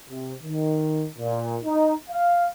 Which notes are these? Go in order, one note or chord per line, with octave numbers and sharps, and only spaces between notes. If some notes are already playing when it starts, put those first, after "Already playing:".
C3
D#3
A#2
D#4
F5